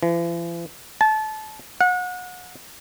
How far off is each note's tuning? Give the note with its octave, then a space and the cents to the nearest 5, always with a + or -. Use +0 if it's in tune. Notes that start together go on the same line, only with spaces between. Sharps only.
E3 +45
A5 -25
F#5 -30